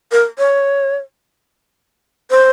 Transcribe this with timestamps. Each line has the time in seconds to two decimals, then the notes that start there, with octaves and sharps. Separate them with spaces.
0.12 A#4
0.38 C#5
2.30 C5